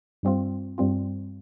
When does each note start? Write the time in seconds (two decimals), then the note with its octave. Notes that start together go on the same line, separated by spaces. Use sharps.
0.23 G2 G3 C4 F4
0.78 G2 G3 C4 F4